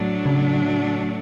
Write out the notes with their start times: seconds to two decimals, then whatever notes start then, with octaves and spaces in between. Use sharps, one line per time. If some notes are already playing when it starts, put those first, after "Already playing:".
Already playing: A2 F#3 A3 D4
0.26 C#3